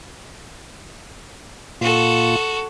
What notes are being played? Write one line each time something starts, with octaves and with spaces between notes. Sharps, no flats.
A#2 F4 F#4 A4